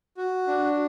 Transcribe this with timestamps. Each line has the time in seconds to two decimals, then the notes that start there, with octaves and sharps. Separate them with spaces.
0.17 F#4
0.47 D4